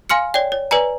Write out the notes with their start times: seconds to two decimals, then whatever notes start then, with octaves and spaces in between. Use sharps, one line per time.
0.09 F5 G#5 C6 F6 C#7
0.34 C#5 D5 G5
0.52 C#5
0.71 B4 D5 G#5 A#5